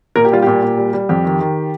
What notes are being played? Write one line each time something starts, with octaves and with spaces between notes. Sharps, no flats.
A#2 A#4
G4
G3 F4
A#2 G4
A#2
G3
G3
F2 G4
D#3
D#3